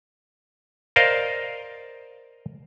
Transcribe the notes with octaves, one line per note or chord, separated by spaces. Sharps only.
A#4 C5 D5 D#5 F5